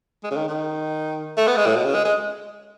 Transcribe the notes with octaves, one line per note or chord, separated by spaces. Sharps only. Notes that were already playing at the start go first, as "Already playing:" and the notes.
G#3
C#3
D#3
D#3
A3
B3
G#3
A2
B2
C#3
G#3
G#3